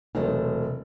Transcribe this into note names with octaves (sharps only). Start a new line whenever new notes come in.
E1 C3 F#3 A3